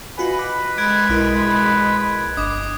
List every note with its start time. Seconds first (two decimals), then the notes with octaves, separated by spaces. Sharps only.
0.18 F4 F#4 B4 D#5 G#5 B5
0.39 D6
0.78 G#3 F#6 G#6 D7
1.09 B1 E4 A#4
2.37 G1 D#5 D6 D#6